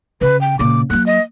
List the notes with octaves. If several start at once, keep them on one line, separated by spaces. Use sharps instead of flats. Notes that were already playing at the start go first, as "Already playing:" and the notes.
C#3 B4
G5
A#2 C#3 D6
F#3 A#3 F#6
D#5